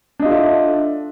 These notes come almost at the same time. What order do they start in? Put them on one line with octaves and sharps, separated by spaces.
D4 D#5 F4 A4 E5